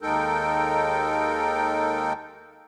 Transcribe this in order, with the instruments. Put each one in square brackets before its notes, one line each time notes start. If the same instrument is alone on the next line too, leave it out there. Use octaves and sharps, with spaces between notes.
[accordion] D#2 G#3 D#4 A4 A#4 G5